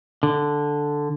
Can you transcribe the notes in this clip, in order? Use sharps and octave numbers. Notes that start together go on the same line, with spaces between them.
D3